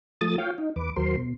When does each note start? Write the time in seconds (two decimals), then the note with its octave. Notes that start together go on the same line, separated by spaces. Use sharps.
0.21 F3 A3 D#6 A6
0.38 F4 C#5 F5 G5
0.58 D#4
0.76 E2 B4 D6
0.96 D#2 F#3 A#4 C5 C6
1.17 B2